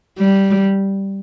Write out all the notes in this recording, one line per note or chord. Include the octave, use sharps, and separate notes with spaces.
G3